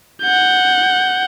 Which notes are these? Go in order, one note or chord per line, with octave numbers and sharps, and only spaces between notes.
F#5 G6